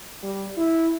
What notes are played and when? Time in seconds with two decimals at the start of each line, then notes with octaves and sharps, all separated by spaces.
0.23 G3
0.57 E4